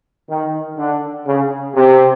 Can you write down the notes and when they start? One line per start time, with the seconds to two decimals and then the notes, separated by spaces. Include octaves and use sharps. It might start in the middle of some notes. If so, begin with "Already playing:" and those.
0.29 D#3
0.77 D3
1.26 C#3
1.75 C3